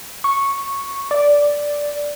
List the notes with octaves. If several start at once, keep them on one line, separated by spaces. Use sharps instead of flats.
C#6
D5